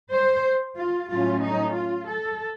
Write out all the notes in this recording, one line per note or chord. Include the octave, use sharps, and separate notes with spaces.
C5
F4
A2 F#3 A3 C#4 F4
D#4
F4
A4